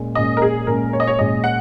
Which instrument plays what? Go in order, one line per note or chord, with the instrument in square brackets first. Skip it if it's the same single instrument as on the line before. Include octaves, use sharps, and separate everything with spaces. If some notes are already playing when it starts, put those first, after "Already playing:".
Already playing: [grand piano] A#2 G#3 C#4
[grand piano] A#2 G#3 C#4 [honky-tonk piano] D#5
[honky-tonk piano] A#4
G#4
[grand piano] A#2 G#3 C#4 [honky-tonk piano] A#4
[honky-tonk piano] C#5
D#5
C#5
[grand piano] A#2 G#3 C#4 [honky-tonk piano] D#5
[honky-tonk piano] F#5